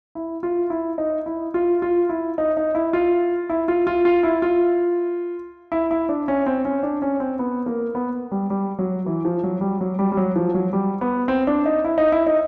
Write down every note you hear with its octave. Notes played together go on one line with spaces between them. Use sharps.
E4
F4
E4
D#4
E4
F4
F4
E4
D#4
D#4
E4
F4
E4
F4
F4
F4
E4
F4
E4
E4
D4
C#4
C4
C#4
D4
C#4
C4
B3
A#3
B3
G3
G3
F#3
E3
F3
F#3
G3
F#3
G3
G3
F#3
F3
F#3
G3
B3
C4
D4
D#4
E4
D#4
E4
D#4